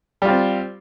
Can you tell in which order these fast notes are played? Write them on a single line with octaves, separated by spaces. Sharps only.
G3 F4 C4